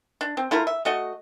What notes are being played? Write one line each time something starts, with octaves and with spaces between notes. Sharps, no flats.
D4
C4
A3 E4 F4 A#4
E5
A3 F#4 D#5